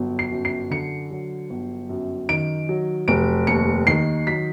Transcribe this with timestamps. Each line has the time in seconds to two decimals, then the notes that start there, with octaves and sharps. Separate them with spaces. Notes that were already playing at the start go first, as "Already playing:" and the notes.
Already playing: G1 F#3
0.19 C7
0.31 F#2
0.45 C7
0.70 D3 C#7
1.11 F#3
1.50 G1
1.89 F#2
2.29 D#3 D7
2.69 F#3
3.08 F1 D7
3.47 D#2 C#7
3.87 D#3 C7
4.27 F#3 B6